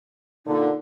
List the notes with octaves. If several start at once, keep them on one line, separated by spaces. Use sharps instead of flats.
A#2 D3 D#4